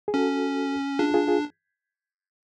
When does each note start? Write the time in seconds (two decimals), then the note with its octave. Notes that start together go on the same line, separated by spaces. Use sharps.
0.08 G#4
0.14 C#4 F#4 A4
0.99 D4 F4 G#4
1.14 F4 G#4
1.27 F4 G#4